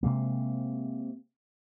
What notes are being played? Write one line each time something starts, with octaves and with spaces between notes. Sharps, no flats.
C3 G#3 A#3